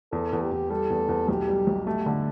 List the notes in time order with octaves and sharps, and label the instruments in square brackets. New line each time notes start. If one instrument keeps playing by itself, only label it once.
[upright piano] E2 [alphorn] A4
[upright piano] E2
[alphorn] G4
[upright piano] E2
[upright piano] G3 [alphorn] A4
[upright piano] E2
E2
[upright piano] B1 [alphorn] G4
[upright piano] G3
B1
[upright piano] A3 [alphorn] G4
[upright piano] D3